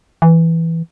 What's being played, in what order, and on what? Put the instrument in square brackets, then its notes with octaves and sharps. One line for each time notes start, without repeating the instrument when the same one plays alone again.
[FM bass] E3